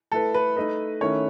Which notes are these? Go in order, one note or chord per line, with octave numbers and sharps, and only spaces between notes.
A3 E4 A4 B4
B4
A3 D#4 A4 B4 D#5
D#3 A3 C#4 E4 C#5